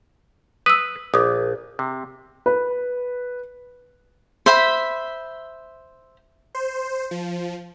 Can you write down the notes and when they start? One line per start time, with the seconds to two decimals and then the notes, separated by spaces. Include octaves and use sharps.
0.66 B4 D#6 E6
1.14 A#1 D6 D#6
1.79 C3
2.46 B4
4.46 C5 E5 B5
6.55 C5
7.11 F3